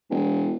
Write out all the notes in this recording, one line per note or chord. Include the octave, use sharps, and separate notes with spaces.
E1